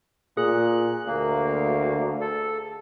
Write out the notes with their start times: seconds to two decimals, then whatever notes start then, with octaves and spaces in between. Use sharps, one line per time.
0.37 A#2 G#4 F#6
1.07 D2 A#3
2.21 A4